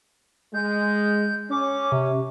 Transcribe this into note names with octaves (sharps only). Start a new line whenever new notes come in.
G#3 G6
C#4 D6
C3